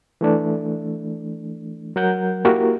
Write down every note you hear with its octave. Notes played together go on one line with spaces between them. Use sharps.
E3 A3 D4
F#3 A#4 F#5 G6
A#3 E4 F#4 G4 A#4